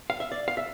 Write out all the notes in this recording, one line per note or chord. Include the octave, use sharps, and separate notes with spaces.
F5
E5
D5
F5
E5